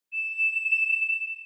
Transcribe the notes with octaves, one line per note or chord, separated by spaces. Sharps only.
E7